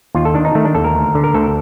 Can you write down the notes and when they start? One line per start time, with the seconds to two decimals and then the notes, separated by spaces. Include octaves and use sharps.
0.15 D#2 F4
0.25 A4
0.34 D#3 D4
0.45 D#4
0.55 D#3 A3
0.65 D4
0.75 D#2 A4
0.84 A#4
0.95 D2
1.15 D3
1.24 A#4
1.34 D2 A4